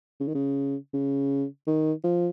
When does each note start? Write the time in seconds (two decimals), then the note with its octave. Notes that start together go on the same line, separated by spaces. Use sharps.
0.20 C#3
0.28 D#3
0.35 C#3
0.94 C#3
1.67 D#3
2.04 F3